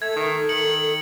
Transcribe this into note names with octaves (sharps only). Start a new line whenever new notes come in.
A3 A4 G#6
D#3
D#3 C#7 F#7